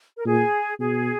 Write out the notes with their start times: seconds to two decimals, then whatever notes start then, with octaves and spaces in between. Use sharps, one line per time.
0.18 A#4
0.25 A#2 G#4
0.79 B2 G#4